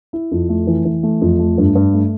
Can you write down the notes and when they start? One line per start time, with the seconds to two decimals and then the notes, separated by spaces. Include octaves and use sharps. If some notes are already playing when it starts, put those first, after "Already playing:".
0.13 E4
0.31 F2
0.49 A3
0.67 E3
0.85 E3
1.03 A3
1.21 F2
1.39 A3
1.58 G2
1.75 G2
1.94 A3